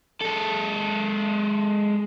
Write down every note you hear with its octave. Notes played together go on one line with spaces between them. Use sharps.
G#3 A4